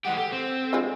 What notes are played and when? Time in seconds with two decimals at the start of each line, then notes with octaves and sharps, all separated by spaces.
0.05 E3 G#3 G4 F#5
0.17 G4 A4
0.32 C4
0.73 D3 F3 G#3